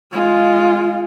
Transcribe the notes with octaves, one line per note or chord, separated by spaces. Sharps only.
G#3 F4